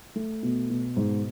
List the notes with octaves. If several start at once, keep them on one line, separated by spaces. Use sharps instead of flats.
A3
B2
B2
G#2